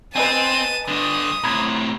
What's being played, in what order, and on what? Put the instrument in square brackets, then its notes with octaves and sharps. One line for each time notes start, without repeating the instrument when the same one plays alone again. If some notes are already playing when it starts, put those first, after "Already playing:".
[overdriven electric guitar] C4 [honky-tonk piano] B4 D#5 G#5 [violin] A5 D#7
[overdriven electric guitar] G2 D3 [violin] D#6
[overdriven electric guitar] A2 C3 [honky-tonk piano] A#5 B5 G#6